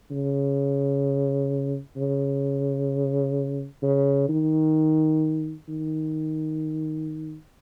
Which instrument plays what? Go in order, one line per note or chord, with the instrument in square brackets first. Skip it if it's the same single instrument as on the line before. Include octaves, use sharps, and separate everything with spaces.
[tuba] C#3
C#3
C#3
D#3
D#3